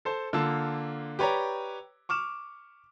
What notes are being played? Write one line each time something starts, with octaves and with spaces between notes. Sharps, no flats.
A4 C5 A5
D3 A#3 F4 A5 E6
G4 B4 C#5 D5 A#5
C#6 D6 F6 E7